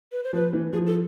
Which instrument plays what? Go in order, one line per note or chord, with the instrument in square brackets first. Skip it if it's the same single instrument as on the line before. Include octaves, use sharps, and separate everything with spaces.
[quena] B4
C5
[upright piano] F3 [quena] B4
[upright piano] E3
[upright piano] F3 [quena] G#4
[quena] A4